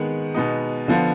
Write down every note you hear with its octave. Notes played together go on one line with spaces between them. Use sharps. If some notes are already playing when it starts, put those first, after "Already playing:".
Already playing: D#3 G#3 B3
B2 G#3 B3 D#4
D3 F3 B3 F4